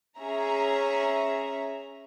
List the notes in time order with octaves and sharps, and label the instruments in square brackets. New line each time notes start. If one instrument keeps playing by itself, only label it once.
[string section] C#4 G#4 E5 A#5